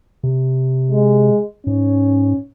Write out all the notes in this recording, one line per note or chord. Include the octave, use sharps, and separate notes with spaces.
C3
G#3
G#2 C#4